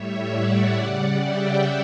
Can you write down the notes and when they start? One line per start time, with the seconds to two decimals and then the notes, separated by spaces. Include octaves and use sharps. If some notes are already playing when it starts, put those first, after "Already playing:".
Already playing: A2 G3 C#5 E5
0.31 D5 F#5
0.76 C#3 G3
1.21 E5 G5